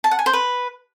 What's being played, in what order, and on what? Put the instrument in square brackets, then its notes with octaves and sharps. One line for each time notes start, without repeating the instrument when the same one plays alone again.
[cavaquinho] A5
F#5
G#5
C5
B4